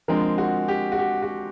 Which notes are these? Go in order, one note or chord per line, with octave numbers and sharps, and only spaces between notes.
D3 F3 G#3 C4 A#4
F#4
G4
F#4
G4
F#4